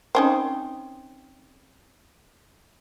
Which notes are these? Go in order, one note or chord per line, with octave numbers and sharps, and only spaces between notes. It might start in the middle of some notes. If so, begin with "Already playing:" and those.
C4 C#4 D#4